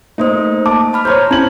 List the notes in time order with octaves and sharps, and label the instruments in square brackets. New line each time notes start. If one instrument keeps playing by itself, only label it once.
[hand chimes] A3 A#3 C5 [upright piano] D#4
[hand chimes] A5 [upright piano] D6
[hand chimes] A5 B5 F6
[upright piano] C5 C#5 [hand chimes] A#5 G6
[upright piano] C#4 F#7 [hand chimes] E4 G#6